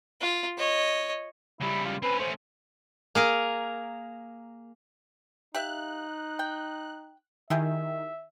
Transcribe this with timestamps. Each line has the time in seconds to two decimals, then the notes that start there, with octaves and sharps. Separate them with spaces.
0.21 F4
0.58 C#5 D#5
1.61 C#3 G3 E4
1.85 F4
2.03 C4 C#4 B4
2.20 A3 C#4 C5
3.15 A#3 G#4 A#4
5.55 D#4 G4 E5 F5 F#6
6.39 G5
7.50 D#3 E4 G4 G#4 E5